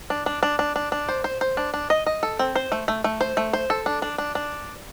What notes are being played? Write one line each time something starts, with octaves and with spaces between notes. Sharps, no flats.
D4
D4
D4
D4
D4
D4
C5
C5
C5
D4
D4
D#5
D#5
A4
C4
C5
A3
A3
A3
C5
A3
C5
A4
D4
D4
D4
D4